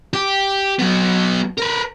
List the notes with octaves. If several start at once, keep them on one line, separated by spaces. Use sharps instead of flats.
G4
F#3 B3
A#4 B4